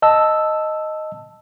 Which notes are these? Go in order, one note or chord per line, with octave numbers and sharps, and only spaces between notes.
D#5 A5 E6